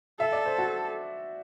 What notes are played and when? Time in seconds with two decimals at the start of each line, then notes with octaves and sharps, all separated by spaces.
0.19 A4 E5
0.32 D5
0.46 C5
0.58 F#4